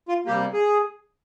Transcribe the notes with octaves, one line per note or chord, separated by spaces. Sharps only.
F4
C3 G3 A#3 G4
G#4